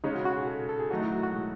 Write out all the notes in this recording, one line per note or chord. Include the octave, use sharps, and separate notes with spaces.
C#3 G#3 C#4 D#4
F#4
F#4
G#4
A4
A4
G#4
D#3 F#3 A3 D#4 F#4 A4
E4
F#4
F#4
G#3